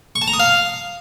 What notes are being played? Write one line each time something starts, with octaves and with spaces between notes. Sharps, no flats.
C#6
A5
A#5
D#6
F5